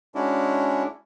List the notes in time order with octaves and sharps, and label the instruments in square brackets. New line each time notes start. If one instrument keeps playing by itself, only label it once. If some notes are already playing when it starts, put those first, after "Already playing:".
[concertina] G#3 C#4 D4 E4 F#4